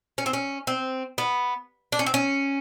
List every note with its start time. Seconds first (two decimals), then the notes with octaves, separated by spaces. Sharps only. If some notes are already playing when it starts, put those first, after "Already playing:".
0.18 C#4
0.26 C4
0.33 C#4
0.67 C4
1.18 B3
1.92 D4
1.99 C#4
2.06 C4
2.14 C#4